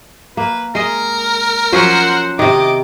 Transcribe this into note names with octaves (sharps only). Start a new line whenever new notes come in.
A#3 B4
G#3 A#4 D#5
F3 F#3 C#4 C5 F#5
C3 D#3 D#5 D6